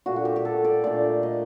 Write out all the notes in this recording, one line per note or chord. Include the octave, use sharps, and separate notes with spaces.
A#2 A3 D4 F#4
F#4
G4
G4
A4
D5
A#2 A3 D4 D5
D#5